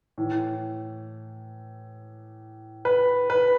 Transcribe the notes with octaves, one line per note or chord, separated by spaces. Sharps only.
A2 E3
B4
B4